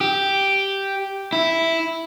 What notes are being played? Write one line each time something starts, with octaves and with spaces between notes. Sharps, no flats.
G4
E4